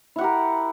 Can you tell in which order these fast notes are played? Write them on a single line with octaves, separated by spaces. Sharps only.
E4 F#5 G4 A#4